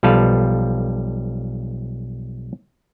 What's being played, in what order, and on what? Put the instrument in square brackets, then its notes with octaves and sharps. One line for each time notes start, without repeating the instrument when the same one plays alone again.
[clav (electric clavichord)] B1 F3 G3 A4 B4 F5